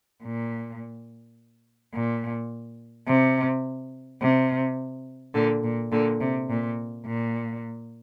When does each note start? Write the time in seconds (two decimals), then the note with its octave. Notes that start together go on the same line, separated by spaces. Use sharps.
0.23 A#2
1.93 A#2
3.07 C3
4.21 C3
5.34 A#2 D3
5.63 A#2
5.92 A#2 D3
6.20 C3
6.48 A#2
7.06 A#2